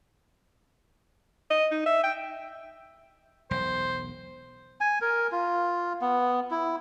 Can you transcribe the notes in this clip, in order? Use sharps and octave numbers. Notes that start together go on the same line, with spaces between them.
D#5
D#4
E5
G5
E1 B1 C5
G#5
A#4
F4
B3
E4